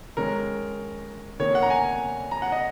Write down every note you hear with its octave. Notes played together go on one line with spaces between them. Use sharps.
D#3 G#3 C#4 A#4
D#3 A#3 C#4 C#5
F#5
A#5
G#5
A#5
F#5
D#5